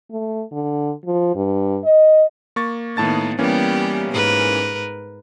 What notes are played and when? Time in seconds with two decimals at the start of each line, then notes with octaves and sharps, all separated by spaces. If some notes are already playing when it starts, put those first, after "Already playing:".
0.11 A3
0.52 D3
1.05 F3
1.35 G2
1.84 D#5
2.56 A#3 C#6 A6
2.97 A2 D#3 A#3 B3 A5 A6
3.39 E3 G3 A#3 B3 C#4 G4
4.12 G#2 A#4 B4